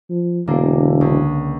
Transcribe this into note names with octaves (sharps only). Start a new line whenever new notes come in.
F3
E1 D3 A#3 D4
C#2